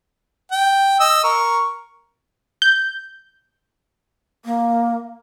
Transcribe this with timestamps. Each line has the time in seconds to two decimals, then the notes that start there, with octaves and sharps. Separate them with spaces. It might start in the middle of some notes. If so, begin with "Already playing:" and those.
0.52 G5
1.00 D#5 E6
1.24 A#4 C#6
2.62 G6
4.45 A#3